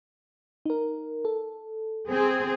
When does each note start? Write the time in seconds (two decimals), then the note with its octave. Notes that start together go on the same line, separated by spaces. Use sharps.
0.66 D#4 A#4
1.25 A4
2.10 C4 G#4